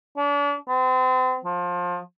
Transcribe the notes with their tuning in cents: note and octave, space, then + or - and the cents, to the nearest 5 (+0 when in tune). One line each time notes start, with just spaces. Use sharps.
D4 -40
C4 -35
F3 +25